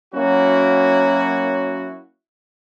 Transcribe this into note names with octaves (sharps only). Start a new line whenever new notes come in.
F#3 A#3 C#4 E4 F#4